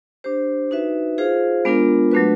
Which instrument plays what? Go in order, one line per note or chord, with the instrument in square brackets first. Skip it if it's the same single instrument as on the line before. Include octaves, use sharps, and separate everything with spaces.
[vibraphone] D4 G4 C5
D#4 F#4 B4 E5
F4 G#4 C5 F5
G#3 B3 D4 F4 A#4
F#3 A3 D4 F#4 B4